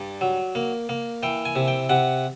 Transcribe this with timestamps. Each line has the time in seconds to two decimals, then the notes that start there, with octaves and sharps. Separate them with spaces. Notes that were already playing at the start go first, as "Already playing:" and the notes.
Already playing: G2 D5
0.21 F#3
0.55 A#3
0.89 A#3
1.23 E3 G5
1.45 G#5
1.56 C3
1.68 G5
1.89 C3 F#5